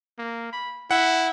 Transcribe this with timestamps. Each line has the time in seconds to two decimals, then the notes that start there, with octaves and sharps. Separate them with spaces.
0.18 A#3
0.53 B5
0.91 E4 F#5